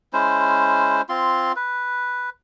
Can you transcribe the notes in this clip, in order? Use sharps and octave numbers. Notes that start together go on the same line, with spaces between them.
G#3 C#4 E4 C5
C4 F4 C6
B4